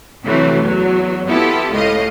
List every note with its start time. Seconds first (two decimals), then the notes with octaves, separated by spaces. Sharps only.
0.24 C3 E3 F#3 A3
0.63 E2 F#3
1.28 B3 E4 F4 G4 A4
1.72 C#2 A2 D#5 F5